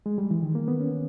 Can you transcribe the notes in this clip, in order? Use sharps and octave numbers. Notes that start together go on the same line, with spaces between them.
G#3
G3
E3
D#3
A#3
B3
C#4